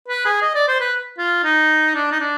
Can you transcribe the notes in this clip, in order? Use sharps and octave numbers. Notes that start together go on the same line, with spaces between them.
B4
G#4
D#5
D5
C5
B4
F4
D#4
D4
D#4
D4